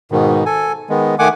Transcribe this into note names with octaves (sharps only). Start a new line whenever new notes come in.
G#2 B2 D#3
A4 G#5
D#3 G#3 B3
D#3 A3 F#5 G#5 D6